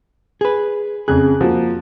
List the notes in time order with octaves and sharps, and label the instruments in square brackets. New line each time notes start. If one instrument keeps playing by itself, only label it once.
[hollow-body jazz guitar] G#4 B4
[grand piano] F2 C#3 F#6 [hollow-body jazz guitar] G#4
[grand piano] F3 A#3 F#4